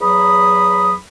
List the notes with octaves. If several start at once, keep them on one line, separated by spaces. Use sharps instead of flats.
E2 F#3 B5 D#6